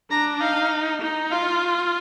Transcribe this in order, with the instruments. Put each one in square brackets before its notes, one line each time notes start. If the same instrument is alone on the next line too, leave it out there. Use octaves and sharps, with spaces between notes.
[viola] D4 [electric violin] A#5
[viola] D#4 [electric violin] F5
[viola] D#4
[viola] F4 [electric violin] F5